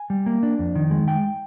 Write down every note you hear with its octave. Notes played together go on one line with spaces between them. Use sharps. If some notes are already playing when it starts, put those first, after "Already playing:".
Already playing: G#5
G3
A#3
D4
F2
D#3
G#3
G#3 G5